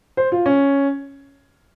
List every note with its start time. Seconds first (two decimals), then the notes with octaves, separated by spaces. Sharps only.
0.17 C5
0.32 F4
0.46 C#4